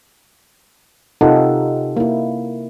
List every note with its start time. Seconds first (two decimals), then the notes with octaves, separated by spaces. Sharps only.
1.21 C3 D#4 F4 G4 A4 F#5
1.97 A#3 E4